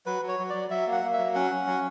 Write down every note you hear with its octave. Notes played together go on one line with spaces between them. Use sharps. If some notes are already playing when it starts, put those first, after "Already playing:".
F#3 B4
F#3
C#5
F#3
F#3 D5
F#3 E5
A#3
F#5
A#3
E5
F#3
C#4 F#5
C#4
F#3